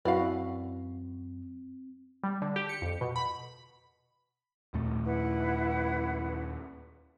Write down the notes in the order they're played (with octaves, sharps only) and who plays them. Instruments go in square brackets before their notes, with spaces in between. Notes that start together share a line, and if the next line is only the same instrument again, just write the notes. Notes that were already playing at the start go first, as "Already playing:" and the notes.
[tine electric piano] F#2 [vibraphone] C4 [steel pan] E4 F#4 B4 [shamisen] D5 F5
[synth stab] G3
D3
G4
C#7
F2
B2
B5
[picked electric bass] D#2 A#2 A3
[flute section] E4 B4 F#5